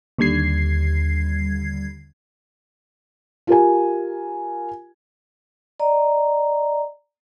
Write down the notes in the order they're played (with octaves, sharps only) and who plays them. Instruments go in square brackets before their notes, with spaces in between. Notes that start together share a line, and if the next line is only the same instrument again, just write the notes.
[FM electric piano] D#2 D3 G3 G#6 C7
[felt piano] F4 G4 A#4 G#5
[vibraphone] D5 D#5 A#5